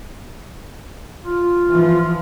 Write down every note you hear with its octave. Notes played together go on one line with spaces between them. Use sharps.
F4
E3 F3